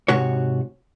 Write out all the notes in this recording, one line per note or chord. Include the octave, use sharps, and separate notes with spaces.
G#2 C3 F#4 C#5